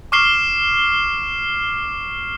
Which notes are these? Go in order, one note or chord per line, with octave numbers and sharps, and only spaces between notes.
C#6 D6 F6 C7 E7 G7